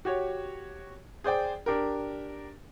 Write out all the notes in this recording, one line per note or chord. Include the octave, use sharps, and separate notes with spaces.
F#4 G4 C#5
G#4 C5 D5 G5
D4 G4 A#4